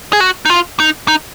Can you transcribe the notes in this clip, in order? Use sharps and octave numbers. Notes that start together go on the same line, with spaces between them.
G#4
F#4
D#4
F4
D#4
D#4